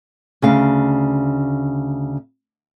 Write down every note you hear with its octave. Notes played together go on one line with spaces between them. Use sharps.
D2 C#3 F5